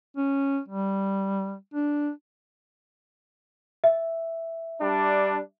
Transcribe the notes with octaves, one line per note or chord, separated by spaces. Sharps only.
C#4
G3
D4
E5
G3 D4